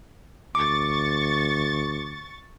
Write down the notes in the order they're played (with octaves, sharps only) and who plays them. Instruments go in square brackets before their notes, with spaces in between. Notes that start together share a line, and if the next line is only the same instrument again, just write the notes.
[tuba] D2 [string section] C#6 A6 [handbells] D6